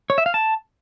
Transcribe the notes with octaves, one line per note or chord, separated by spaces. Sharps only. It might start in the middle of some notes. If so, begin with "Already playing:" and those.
C#5
E5
F5
A5